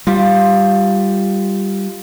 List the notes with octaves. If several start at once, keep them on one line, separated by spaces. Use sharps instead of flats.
G3 F4